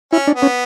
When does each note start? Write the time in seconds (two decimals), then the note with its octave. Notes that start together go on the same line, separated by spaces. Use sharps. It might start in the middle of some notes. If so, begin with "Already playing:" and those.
0.13 C#4 E4
0.27 D4
0.35 B3
0.42 C#4